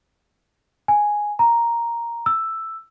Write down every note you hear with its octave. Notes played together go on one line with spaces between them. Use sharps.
G#5
A#5
E6